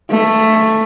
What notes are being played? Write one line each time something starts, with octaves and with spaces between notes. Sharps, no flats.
A3